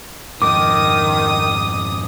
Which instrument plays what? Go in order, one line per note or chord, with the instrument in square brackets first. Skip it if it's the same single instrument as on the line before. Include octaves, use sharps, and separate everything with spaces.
[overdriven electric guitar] F2 G#2 [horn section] D#3 [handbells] D6 [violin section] D#6